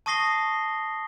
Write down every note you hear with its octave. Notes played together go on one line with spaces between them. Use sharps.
A5 C#6 D#6 A#6 C7 G7